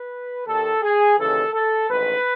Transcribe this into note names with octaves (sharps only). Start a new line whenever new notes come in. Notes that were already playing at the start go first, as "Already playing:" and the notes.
Already playing: B4
D#2 D#3 A4
G#4
D#2 C#3 E3 A4
A4
A1 G#2 D#3 B4